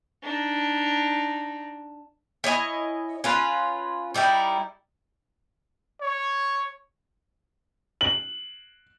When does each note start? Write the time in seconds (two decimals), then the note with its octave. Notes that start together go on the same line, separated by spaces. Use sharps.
0.23 D4 D#4
2.44 E4 C#5 D#5 G#5
3.24 C#4 F4 B4
4.14 G3 D#4 E4 G4
6.00 C#5
8.01 F#7